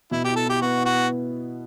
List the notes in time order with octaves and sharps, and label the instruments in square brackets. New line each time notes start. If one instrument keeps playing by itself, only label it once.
[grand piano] B2 [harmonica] E4
[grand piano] E4 [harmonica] G4
[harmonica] A4
[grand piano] E4 [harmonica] G4
[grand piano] B3 [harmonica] F#4
[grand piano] E4
[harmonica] F#4
[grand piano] B3